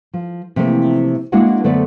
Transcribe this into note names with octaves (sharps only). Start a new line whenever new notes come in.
F3
C3 E3 F3 A3 A#3 C4
G#3 A#3 D4 E4 F#4 F#5
F#2 D3 A3 B3 C5 D5